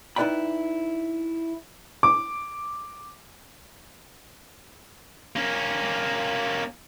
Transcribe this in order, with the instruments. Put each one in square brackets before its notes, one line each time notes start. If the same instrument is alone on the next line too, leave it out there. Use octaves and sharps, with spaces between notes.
[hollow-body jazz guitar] D#4 E4 B4 D5 G5 B5
[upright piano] D6
[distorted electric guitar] A#3 C#4